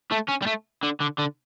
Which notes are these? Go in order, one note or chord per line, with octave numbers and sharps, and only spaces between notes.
A3
C#4
G3
A3
D3
D3
D3